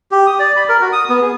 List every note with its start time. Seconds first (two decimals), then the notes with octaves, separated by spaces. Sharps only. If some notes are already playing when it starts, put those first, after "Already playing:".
0.11 G4
0.27 D#6
0.39 D5
0.56 B5
0.69 A#4
0.81 F#4
0.92 D#6
1.10 B3
1.22 G#4